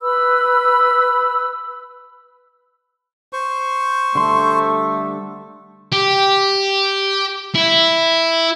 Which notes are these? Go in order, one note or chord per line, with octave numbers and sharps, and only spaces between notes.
B4 B5 E6
C5 C#6
D3 G3 A3 C6
G4
E4